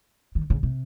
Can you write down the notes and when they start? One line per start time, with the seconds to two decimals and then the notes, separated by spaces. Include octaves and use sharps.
0.35 D#3
0.50 C#3
0.63 C3